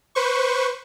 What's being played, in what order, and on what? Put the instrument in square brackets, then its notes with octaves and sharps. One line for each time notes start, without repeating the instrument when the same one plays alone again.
[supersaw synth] B4 C5 C#6